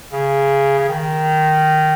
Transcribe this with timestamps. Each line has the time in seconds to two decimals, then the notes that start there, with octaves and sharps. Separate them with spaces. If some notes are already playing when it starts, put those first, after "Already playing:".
0.12 C#3
0.78 C#3
0.89 D#3